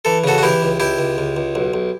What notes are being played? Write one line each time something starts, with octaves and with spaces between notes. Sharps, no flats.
E3 A4
C#3 F#4 A4
F#4
E3 E4 G4
C#2
C#2 E4 G4
C#2
C#2
C#2
B1
B1